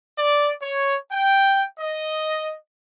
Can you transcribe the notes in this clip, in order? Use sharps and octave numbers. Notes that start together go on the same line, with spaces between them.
D5
C#5
G5
D#5